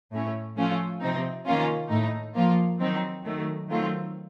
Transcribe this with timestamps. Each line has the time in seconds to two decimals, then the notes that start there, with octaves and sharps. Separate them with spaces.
0.12 A2 A3 C#4
0.57 F3 A3 C#4 F4
1.01 C3 F3 C4 D#4
1.46 D#3 A#3 C#4 F4
1.91 A2 A3 D#4
2.35 F3 A#3 F4
2.80 D#3 F#3 C4 D#4
3.25 D#3 F#3 A3
3.69 D#3 F#3 A3 C4 F4